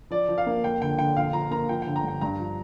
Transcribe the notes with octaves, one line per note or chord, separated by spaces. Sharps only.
F3 D5
F3
F5
A#3
F2 G5
D3 G5
D3 G5
A#1 F5
F3 A#5
A#3 A#5
F3 G5
G5
D3
A#5
G2 G5
G2 A#5
F3